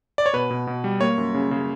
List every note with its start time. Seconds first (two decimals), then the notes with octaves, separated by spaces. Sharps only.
0.18 D5
0.26 C#5
0.33 B2 B4
0.50 B2
0.67 B2
0.84 G3
1.01 A#3 C#5
1.18 F#2
1.34 C#3
1.51 C#3